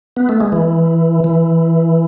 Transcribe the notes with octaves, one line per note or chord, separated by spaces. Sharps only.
B3
A3
G#3
E3
E3